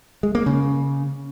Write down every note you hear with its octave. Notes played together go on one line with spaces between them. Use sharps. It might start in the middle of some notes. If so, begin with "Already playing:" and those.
G#3
A#3
C#3